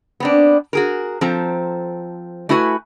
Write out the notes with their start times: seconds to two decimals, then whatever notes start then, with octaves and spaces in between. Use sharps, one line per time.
0.20 B3 C4 D4
0.73 F#4 G#4 A#4
1.21 F3 C4 A4 A#5
2.49 A3 E4 F#4 B4 G#5